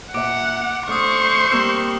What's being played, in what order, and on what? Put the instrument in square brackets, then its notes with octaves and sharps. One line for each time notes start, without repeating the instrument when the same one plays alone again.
[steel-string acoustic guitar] A#2 E5 [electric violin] F#5 [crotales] D6 D7
[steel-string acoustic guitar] A3 D4 [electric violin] C5 C#6 [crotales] D#6 F6
[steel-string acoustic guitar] G3 A#3 C4 [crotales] E6 E7